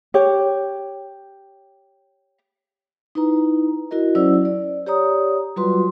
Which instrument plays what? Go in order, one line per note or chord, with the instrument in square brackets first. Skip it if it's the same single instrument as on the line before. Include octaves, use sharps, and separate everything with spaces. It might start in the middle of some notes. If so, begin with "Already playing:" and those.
[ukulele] G4 C#5
[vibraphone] D#4 E4 B4 A#5
E4 F#4 A#4 D#5
F#3 C#4 E4 C5 D5 E6
D5
G4 C#5 D5 A#5 D#6
F#3 G3 F4 F#4 B4 C6